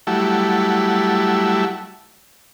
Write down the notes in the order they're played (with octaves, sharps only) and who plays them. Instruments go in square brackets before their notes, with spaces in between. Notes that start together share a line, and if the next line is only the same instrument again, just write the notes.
[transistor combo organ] F#3 G3 A3 E4